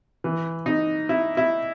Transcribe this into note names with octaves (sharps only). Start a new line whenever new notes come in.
E3
D#4
E4
E4